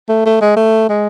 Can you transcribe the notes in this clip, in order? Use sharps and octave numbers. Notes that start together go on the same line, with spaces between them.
A3
A3
G#3
A3
G#3